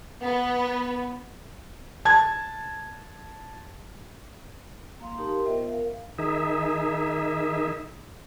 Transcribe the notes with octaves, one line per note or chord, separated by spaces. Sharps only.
B3
A5 G#6
A#3 F5 C6
D#4 G4 A#4 A5 C6
A#4
B3 F4 C5 D#5 E5 G5
A#4
F5
D#3 D#4 G#4 E5